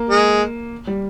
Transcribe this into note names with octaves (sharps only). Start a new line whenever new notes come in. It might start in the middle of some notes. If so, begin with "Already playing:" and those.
Already playing: A#3
G#3
G3